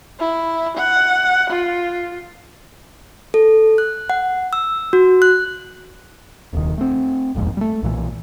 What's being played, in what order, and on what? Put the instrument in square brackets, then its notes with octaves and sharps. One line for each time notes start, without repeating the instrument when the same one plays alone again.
[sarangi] E4
F#5
F4
[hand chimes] A4
F#6
F#5
E6
F#4
F#6
[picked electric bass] D#1 C2 D#3
A3 C4
D#1 A#1 F2 G#2
G3 A3
B1 A#2 E3